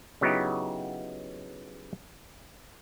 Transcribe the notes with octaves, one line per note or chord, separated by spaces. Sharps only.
C#3 F#3 B3 D#4 E4 G4